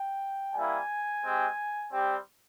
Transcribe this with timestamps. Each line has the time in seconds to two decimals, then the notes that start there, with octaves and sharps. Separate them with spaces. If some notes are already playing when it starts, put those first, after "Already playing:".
Already playing: G5
0.54 G3 A#3 E4 G#5
1.23 G#3 C4 G4
1.92 G3 C4 G4